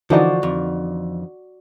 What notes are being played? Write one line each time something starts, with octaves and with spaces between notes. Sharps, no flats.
D3 E3 F3 D#4 F#4 D5
F2